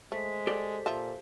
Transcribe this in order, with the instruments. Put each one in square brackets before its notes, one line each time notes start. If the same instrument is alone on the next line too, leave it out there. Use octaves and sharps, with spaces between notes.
[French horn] G#3 [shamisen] A3 [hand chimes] C5 B6
[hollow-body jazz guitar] G4 A4 D5
[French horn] A#2 [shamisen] F3 E5 A5